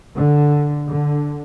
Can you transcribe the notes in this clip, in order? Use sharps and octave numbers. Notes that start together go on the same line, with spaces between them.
D3
D3